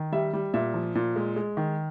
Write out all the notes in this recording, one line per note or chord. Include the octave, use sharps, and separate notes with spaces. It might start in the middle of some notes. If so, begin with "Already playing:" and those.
Already playing: D#3
G3 E5
G3
A#2 E5
F3
A#2
G#3
G#3
D#3